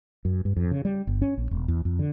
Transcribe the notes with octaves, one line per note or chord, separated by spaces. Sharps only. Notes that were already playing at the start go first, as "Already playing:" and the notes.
F#2
G2
F2
C#3
G3
G1
C#4
A#1
E1
E2
F2
D3